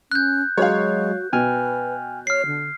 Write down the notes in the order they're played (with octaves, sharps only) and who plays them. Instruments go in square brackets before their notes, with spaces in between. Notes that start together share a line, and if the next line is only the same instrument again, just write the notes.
[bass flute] C#4 [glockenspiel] F#6 G6
[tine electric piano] F#3 G#3 [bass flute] F#4 [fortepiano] C#5 F5
[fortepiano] B2 [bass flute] B4 [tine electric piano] G5 G#5 F6
[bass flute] C#5 [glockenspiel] F6 C7
[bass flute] D3